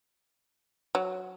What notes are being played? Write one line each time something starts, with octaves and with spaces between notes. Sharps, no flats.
F#3